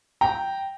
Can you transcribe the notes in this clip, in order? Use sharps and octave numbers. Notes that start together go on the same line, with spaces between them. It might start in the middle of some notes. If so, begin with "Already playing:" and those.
G5 A#5